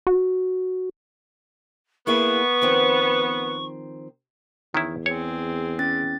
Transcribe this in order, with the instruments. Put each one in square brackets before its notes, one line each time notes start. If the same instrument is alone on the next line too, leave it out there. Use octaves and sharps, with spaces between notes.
[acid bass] F#4
[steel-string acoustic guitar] A#3 E4 G#4 [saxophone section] B3 [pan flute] C#6
[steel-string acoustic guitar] D#3 F3 C4
[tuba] E2 [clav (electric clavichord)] D#3 C#4 E4
[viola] C4 G#4 [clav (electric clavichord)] C#5
[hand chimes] C#4 A6